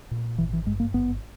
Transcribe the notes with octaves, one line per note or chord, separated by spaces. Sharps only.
A#2
G#1 E3
E3
G2 G#3
A#3
G#1 B3